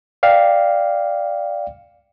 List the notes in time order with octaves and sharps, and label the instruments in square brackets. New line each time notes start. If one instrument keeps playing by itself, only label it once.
[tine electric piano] D5 F5 G5